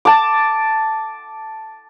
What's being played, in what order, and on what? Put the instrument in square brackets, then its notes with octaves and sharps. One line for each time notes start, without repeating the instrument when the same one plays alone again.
[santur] A5 D6